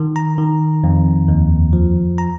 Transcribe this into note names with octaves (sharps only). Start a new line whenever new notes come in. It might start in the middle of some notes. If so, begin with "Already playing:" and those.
Already playing: D#3
A#5
D#3
F2
D#2
F3
A#5